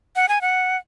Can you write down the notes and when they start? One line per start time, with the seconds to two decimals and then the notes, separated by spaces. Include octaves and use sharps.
0.16 F#5
0.29 G#5
0.42 F#5